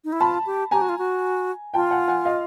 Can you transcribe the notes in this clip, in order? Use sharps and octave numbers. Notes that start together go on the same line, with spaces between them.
D#4
E4
F4 A5 B5
G4
G4 G#5 A#5
F#4
F4
F#4
F4 G5 A5
F#5 G#5
F#5 G#5
D#5 F5